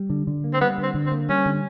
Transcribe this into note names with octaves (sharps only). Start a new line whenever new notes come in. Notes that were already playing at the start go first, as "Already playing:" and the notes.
Already playing: G3
D3
D3
A#3
C4
G3 B3
D3
C4
D3
C4
A#3
G3 C#4
D3